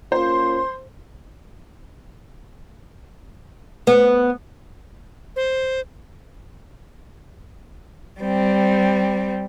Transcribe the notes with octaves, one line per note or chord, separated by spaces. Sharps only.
A#3 C#4 F4 C5 C6
B3
C5
G3 C4